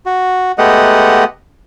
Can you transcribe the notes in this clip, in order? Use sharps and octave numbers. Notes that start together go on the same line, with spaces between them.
F#4
G#3 A3 B3 G4 D#5 F#5